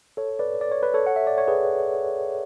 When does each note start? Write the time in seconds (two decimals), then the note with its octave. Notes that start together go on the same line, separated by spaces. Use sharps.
0.17 A4 C#5
0.39 B4 D5
0.61 D5
0.72 C#5
0.83 B4
0.94 A4 C#5
1.06 F#5
1.16 E5
1.27 D5
1.38 C#5
1.48 G#4 B4